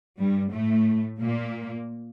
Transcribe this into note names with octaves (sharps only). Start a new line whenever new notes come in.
G2 G3
A2 A3
A#2 A#3